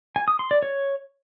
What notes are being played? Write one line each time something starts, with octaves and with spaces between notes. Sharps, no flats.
G#5
D#6
C6
D5
C#5